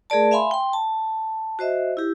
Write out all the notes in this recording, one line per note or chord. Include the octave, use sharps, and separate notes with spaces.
A3 G#4 A#4 D5 A5
E5 F5 G#5 B5 C6
G5 C6
A5
F#4 C5 D#5 E5
E4 G4